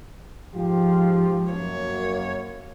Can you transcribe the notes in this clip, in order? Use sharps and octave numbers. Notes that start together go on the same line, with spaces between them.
G#2 F3 F4 G4
F#2 A#3 C#5